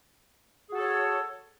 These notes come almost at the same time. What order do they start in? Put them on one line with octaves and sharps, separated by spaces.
G#4 F#4 A4 C#5